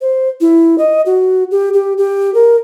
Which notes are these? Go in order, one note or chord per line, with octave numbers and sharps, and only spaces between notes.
C5
E4
D#5
F#4
G4
G4
G4
A#4